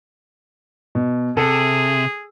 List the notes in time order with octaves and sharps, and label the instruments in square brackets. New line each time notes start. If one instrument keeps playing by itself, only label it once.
[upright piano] B2
[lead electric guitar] C3 [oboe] G#4 [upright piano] A4